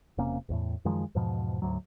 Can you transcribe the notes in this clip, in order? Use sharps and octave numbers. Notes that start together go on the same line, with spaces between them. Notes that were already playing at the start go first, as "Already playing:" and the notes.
E1 C3 A#3 C#4
A1 E2 A2
F#2 D#3 F3 G#3
E2 G#2 B2 F3
D2 G#2 F#3